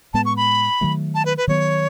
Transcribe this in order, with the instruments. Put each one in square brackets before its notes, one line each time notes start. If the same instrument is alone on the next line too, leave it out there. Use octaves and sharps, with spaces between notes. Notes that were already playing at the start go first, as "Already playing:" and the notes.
[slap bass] A2 G#3 B3 [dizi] A5
[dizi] C#6
B5
[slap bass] D#3 F#3 A3
[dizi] A5
B4
B4
[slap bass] D#3 F#3 B3 [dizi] C#5